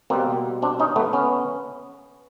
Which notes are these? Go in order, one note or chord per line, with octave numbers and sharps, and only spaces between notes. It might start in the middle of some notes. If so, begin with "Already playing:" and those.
B2 G3 A#3 C4
C4 D4
C#4 D#4
A3 B3
B3 C#4